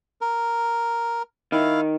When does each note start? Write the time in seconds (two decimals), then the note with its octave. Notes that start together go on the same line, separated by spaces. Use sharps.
0.21 A#4
1.52 D#3 E4 F5